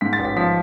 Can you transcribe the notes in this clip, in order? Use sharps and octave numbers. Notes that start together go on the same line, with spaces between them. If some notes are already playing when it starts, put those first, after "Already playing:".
G#2 B6
A6
A1
B6
F3 B6